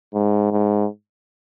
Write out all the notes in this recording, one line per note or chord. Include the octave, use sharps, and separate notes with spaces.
G#2
G#2